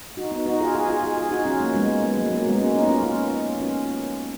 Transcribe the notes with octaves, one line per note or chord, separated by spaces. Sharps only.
D#4 F#4
B3 D#4
D#4 F#4
F4 G#4
F4 G#4
F4 G#4
F4 G#4
F4 G#4
D#4 F#4
C#4 F4
A#3 C#4
G#3 B3
G#3
G#3 B3
F#3 A#3
F#3 A#3
G#3 B3
A#3 C#4
B3 D#4
C#4 F4
C#4 F4
C#4 F4